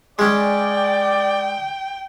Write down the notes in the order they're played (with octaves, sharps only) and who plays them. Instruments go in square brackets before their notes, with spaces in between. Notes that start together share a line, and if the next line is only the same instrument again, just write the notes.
[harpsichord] G#3 C#4 [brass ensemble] D5 [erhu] G5